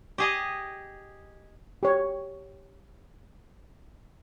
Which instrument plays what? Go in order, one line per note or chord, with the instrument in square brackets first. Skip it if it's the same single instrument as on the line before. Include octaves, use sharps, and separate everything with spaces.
[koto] G4 G#4 D#5
[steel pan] G4 C#5